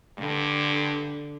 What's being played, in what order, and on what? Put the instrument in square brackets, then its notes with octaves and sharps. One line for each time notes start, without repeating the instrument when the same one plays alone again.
[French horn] G2 [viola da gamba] D3